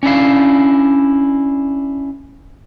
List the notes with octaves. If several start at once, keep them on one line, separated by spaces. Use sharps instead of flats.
C#4 D4 E4 F5